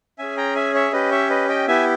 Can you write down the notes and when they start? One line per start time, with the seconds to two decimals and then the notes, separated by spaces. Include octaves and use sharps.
0.18 C#4 G#4 E5 G#5
0.37 G5 A#5
0.55 E5 G#5
0.74 C#5 E5
0.92 C#4 G4 B4 D#5
1.11 C#5 E5
1.30 B4 D#5
1.49 D#5 G5
1.67 B3 E4 G4 E5 G#5